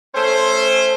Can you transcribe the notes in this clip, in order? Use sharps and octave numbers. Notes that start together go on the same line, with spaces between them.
A3 C#4 C5